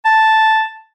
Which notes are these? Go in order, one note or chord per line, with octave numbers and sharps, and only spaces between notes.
A5